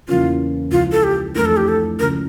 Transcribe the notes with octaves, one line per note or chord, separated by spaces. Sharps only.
E2 C#3 E3 A#3 C#4 F4
C#2 C#3 F3 C#4 E4 F4
A4
G4
F2 E3 A3 D4 A#4
A4
G4
A4
C#2 C#3 F3 C#4 A#4